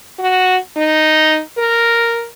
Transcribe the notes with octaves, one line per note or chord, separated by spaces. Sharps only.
F#4
D#4
A#4